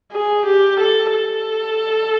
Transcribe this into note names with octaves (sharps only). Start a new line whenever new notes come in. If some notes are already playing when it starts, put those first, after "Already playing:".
G#4
G4
A4
A4